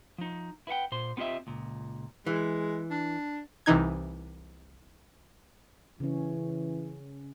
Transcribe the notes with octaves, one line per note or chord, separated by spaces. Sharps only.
F3 D#4
E4 B4 E5 F#5 G5
A#2 C5 C6
B3 C4 F4 G4 D#5 E5
C#2 A#2
E3 G#3
D4
C2 C3 E3 D#4 G#6
C#3 E3 C#4